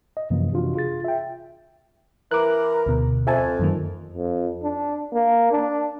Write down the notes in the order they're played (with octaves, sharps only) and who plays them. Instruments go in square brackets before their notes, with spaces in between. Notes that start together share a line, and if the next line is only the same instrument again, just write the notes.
[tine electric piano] D#5
F#2 C3 E3 F3 A#3
C3 E3 D4 F4 F#4
F4 G#4 A6
E5 G5
[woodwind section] E3 A#4 [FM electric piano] D6 F#6
[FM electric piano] D2 B2
[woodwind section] F2 [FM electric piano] E5 G#5 A5
[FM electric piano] F#2 D#3 A#3
[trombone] F2
D4
A#3
D4